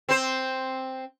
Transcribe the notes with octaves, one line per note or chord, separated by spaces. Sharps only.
C4 C5